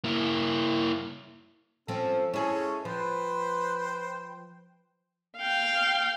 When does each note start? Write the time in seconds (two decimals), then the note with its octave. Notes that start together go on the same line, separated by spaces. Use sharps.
0.04 A#3 E4
1.88 F3 C4 C#4 A4
2.34 G#3 C#4 E4 G#4 A4 C#5
2.85 F3 B4 C5 G5
5.37 F5 G5